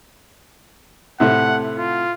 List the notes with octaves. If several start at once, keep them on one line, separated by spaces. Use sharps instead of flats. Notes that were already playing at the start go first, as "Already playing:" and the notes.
A2 C3 A3 F#5
F4